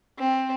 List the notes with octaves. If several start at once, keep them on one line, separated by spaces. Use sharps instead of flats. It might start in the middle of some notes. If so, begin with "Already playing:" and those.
C4